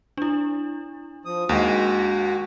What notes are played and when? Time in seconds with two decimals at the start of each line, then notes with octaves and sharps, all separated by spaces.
0.17 D4 E4
1.25 F3 D#6
1.49 D#2 G#3 F#4